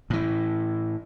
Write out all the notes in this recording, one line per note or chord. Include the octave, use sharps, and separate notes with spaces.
A2 E3